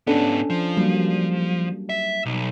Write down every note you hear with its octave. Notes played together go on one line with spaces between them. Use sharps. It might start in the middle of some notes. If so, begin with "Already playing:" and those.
G#2 B3 C#4 D4 A4
F3
F#3 G3 A#3
E5
B1